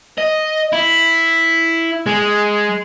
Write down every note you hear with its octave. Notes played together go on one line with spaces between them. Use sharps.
D#5
E4
G#3